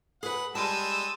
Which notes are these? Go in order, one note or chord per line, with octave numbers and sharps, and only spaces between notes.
G#4 B4 F#5
G3 G#3 A5 E6 D#7